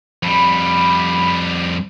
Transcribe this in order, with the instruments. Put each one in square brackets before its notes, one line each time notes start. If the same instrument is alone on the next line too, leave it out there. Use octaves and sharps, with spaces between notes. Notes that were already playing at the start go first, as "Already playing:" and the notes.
[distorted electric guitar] F2 G3 [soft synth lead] B5